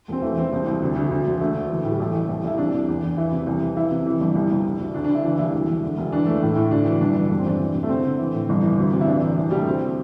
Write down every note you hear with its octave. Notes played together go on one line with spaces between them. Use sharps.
E1 C4
E3 A3
E3 C4
C2 C4
C2
D2
D2
D2
E1
D3 A3
D2
E3
A2
G3
A1 A3
A1
C2
C2 E4
C3 D4
C2
E2
E2
E3 E4
C3
C2
E3
E3 E4
C3
E3
G1
C2
C2
D3
D2
D2 D4
D4
D2
E4
E3 D4
C2 E4
E1
E1
D3
E1
E3 D4
E3 A3
A2
A2
D2 D4
E3
G1 D4
G2
E1 D4
C4
E1 D4
E3
C3
A3
D3 C4
D3
E3
A2
G1
E3
D2
C3
E4
E3 D4
A1
C2
C2 G3
A3
D2 C4